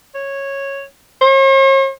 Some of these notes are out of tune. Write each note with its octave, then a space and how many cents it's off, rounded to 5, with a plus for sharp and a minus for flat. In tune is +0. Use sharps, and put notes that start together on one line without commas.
C#5 -10
C#5 -45